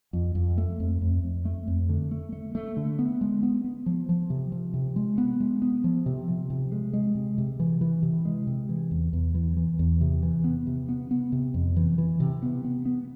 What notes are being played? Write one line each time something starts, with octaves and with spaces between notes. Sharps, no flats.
F2
F2
A3
F2
F2
F2
A3
F2
D3
A3
A3
A3
D3
B3
G#3
B3
B3
F3
F3
C3
F3
C3
G#3
B3
G#3
B3
F3
C3
F3
C3
G#3
G#3
C3
C3
E3
E3
C3
G#3
C3
E3
E2
E2
E3
E3
E2
C3
E3
B3
C3
B3
B3
C3
F2
E3
E3
C3
B3
B3
B3